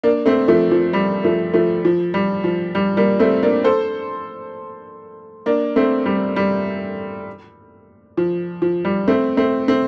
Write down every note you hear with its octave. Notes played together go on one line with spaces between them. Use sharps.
A#3 D4
A3 C4
F3 A3
F3
G3
F3 A3
F3 A3
F3
G3
F3
G3
G3 A#3
A3 C4
A#3 D4
A4 C5
A#3 D4
A3 C4
G3
G3
F3
F3
G3
A3 C4
A3 C4
A3 C4